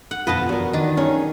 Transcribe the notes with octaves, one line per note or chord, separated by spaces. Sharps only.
F#5
F2 B2 D3 F4 B4 D#5 A5
E2 F#4 A#4
D#3 D4
C#4 D#4 G#4